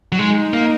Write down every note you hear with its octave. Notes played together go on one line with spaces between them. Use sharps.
F#3
G#3 D#4
A#3